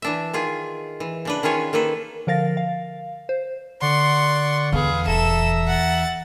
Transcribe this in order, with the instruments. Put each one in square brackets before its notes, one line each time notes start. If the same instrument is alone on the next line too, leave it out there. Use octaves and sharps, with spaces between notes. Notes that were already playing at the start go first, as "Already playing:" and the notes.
[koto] E3 D4 E5
D#3 F4 G#4
E3
C#3 D4 B4
D#3 C#4 F4 G#4 C#5
D#3 A#3 A4 B4
[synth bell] D3 F3 A#4 F5 A6 A#6
F5
C5
[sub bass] D3 [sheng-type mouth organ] D5 F#5 C#6 [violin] C6
[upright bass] E2 [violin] B3 G#4 [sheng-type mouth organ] F5
[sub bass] D#1 [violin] A4 E7 [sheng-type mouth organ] E5 A#5
[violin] F#5 A6